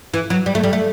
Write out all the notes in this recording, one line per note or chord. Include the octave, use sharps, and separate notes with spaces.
E3
F#3
G3
A3
G3
A3